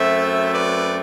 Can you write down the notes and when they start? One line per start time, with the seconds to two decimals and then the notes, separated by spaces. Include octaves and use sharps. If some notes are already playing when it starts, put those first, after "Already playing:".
Already playing: F#2 F#3 A3 C4 C5 E5
0.53 B4 D5